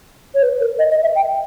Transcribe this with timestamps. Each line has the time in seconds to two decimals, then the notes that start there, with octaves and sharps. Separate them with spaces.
0.35 C#5
0.42 B4
0.60 A#4
0.79 D#5
0.91 D#5
1.03 E5
1.15 G5